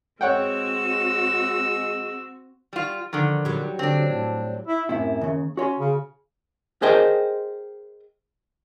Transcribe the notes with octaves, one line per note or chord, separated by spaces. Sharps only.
G#3 C4 F#4 C#5 F#5 G5 E6
G3 F4
D3 D#3 F3
F#3 G3
D3 C4 D4
A2
E4
F#2 A2 C3 E4
D#2 C#3
C#4 F#4 C#5 C6
C#3
G#4 A#4 C5 D#5 G5